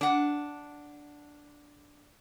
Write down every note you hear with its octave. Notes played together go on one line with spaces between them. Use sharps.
D4 F#5